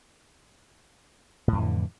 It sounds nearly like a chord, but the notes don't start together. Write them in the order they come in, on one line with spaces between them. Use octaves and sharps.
A2 F2 E3 D3